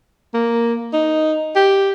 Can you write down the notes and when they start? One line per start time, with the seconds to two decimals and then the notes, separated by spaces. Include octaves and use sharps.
0.34 A#3
0.93 D#4
1.56 G4